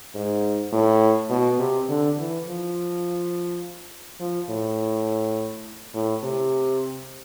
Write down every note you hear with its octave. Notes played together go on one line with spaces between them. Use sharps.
G#2
A2
B2
C3
D3
E3
F3
F3
A2
A2
C3